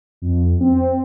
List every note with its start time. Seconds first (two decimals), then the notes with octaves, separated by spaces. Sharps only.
0.22 F2
0.60 C4